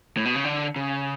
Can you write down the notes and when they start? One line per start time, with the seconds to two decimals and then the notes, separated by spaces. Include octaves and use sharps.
0.17 A2
0.25 B2
0.35 C#3
0.44 D3
0.76 C#3